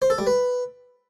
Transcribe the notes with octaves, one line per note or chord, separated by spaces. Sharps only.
C5
A4
G3
B4